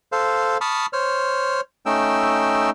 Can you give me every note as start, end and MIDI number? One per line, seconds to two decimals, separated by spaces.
0.12 0.57 69
0.12 0.57 72
0.12 0.57 77
0.61 0.86 81
0.61 0.86 83
0.61 0.86 85
0.61 0.86 87
0.61 0.86 89
0.93 1.61 72
0.93 1.61 73
0.93 1.61 89
1.86 2.70 57
1.86 2.70 61
1.86 2.70 63
1.86 2.70 79
1.86 2.70 88